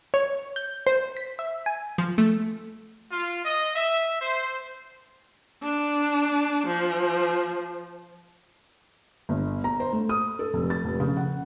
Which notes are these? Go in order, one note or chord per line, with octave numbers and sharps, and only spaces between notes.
C#5
G6
C5
B6
E5
G#5
F3
A3
F4
D#5
E5
C5
D4
F3
G1
A#5
C5
A3
D#6
A4
F1
A6
F1
C#3
F#5